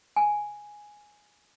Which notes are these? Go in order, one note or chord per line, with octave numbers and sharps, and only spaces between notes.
G#5